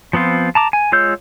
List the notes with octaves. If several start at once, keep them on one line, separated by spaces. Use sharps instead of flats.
F3 B3 C4 F4
A5 A#5 D6
G#5
G#3 F4 C#5 E6 G6